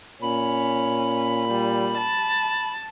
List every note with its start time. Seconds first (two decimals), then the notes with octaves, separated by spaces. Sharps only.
0.22 A#2 C#4 B5
1.48 G3
1.97 A5